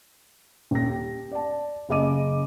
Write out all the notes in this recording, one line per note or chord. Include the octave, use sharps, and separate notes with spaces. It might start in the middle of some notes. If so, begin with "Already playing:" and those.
D#1 A#6
G4
D5 A5
F#1 C#3 D#5 D6 D#7